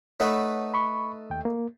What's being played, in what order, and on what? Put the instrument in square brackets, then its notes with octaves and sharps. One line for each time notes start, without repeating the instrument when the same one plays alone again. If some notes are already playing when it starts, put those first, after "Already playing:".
[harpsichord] A3 D#4 B4 [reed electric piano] C#5 F#5
[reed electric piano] B5 C#6
D#2 G5
A#3